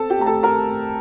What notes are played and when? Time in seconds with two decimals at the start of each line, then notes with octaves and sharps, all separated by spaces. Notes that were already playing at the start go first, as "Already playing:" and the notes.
Already playing: C4 A4 A5
0.10 G4 G5
0.19 A3 A#5
0.26 A4 A5
0.43 C4 A#4 A#5
0.68 A2